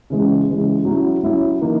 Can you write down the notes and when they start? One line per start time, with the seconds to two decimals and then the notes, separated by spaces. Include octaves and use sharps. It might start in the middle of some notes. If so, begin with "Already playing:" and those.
0.10 C#3 E3 G#3
0.48 C#3 E3 G#3
0.85 F#3 C#4 E4
1.23 F#3 C#4 E4
1.61 E3 A#3 D#4